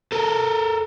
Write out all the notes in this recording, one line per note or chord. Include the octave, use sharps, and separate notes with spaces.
A4 A#4